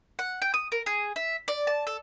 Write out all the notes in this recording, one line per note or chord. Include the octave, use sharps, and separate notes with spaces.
F#5
G5
D#6
A#4
G#4
E5
D5
A5
A4